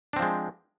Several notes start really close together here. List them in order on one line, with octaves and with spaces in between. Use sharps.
D4 C4 F3 G#3